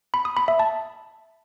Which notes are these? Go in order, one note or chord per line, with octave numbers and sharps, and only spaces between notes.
B5
D#6
B5
E5
A5